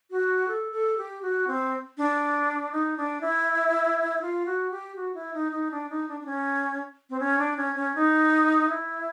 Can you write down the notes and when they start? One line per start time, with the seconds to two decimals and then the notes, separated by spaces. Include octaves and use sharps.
0.11 F#4
0.48 A4
0.72 A4
0.98 G4
1.22 F#4
1.47 C4
1.97 D4
2.72 D#4
2.97 D4
3.21 E4
4.22 F4
4.46 F#4
4.71 G4
4.96 F#4
5.14 E4
5.34 D#4
5.52 D#4
5.71 D4
5.89 D#4
6.08 D4
6.20 D4
6.26 C#4
7.10 C4
7.20 C#4
7.39 D4
7.57 C#4
7.75 C#4
7.95 D#4
8.69 E4